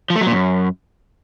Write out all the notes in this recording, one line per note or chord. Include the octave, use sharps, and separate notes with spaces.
F3
A3
F#3
A#2
F#2